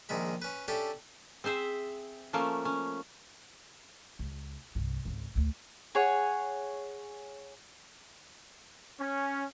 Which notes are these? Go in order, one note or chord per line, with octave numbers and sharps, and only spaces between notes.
A#1 D#3 G#3 E5 B5
C#4 B4
C#4 D4 G4 A4 E5
C4 G#4 C5 E5
F3 A3 A#3 C#4
C#4
C#2
C2 G2
G#1 C#2
D2 A2
G#4 C#5 F#5
C#4